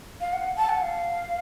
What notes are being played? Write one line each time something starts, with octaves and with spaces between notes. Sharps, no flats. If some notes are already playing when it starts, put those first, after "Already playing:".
F5
F#5
A5
F#5
F5